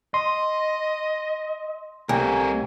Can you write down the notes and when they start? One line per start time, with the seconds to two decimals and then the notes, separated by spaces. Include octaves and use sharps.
0.14 D#5 C6
2.09 C2 A3 A#4 G#5